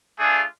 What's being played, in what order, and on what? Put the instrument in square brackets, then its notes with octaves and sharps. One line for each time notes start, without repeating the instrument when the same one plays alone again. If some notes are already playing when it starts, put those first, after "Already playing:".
[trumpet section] A3 D4 F4 G#4